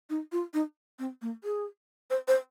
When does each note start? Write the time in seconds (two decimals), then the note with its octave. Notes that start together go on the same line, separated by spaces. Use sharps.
0.10 D#4
0.32 F4
0.54 D#4
0.99 C4
1.22 A#3
1.44 G#4
2.10 C5
2.28 C5